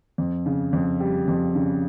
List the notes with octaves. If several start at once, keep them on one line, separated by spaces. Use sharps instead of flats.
F2
C#3
F2
G3
F2
C#3